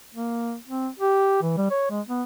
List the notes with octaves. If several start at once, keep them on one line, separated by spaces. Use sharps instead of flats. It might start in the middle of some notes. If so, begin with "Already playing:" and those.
A#3
C4
G4
E3
G3
C#5
G#3
B3